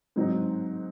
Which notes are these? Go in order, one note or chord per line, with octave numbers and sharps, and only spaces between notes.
G#2 F#3 C4 D#4